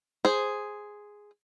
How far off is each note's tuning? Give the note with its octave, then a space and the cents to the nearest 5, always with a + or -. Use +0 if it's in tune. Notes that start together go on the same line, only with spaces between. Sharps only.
G#4 +0 C5 +0